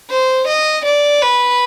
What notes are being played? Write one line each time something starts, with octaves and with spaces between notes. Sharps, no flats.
C5
D#5
D5
B4